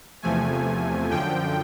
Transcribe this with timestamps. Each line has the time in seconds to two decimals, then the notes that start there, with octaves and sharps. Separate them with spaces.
0.22 E2 C3 F3 A3 G#5
1.10 F#2 D3 F3 G5